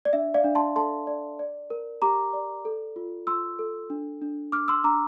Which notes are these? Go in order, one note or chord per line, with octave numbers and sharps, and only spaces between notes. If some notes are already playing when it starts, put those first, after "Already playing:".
D5
D4 E5
D5 F5
D4
A5 C6
A4 A5 C6
D5
D5
A#4
G4 A#5 D6
D5
A4
F4
F4 C6 E6
A4
D4
D4
D4 D6 F6
C6 E6
D4 A#5 D6